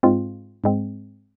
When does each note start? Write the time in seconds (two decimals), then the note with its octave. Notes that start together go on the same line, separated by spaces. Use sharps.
0.03 G#2 G#3 C4 F4
0.64 G#2 G#3 C4